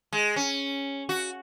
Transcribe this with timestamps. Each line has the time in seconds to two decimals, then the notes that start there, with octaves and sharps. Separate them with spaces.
0.13 G#3
0.36 C#4
1.09 F#4